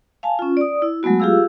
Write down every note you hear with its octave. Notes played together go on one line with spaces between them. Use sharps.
F5 G#5 A5
C#4 F4
D5 D#6
E4
F#3 G#3 A3 B3 F#4
F4 G4 G#4 F5 E6